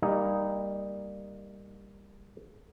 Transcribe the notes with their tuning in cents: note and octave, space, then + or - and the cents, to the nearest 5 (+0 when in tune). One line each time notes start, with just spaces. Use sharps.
G3 +20 A#3 +0 D#4 +0